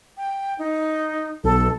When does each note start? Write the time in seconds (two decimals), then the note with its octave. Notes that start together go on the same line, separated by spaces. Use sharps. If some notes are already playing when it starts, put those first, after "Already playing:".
0.17 G5
0.59 D#4
1.44 B1 A4